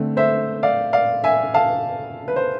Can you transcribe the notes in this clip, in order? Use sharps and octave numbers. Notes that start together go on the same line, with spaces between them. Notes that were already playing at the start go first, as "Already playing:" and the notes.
Already playing: D3 A3 C4
C5 E5
D5 F5
D5 F5
E5 G#5
F5 A5
B4
C5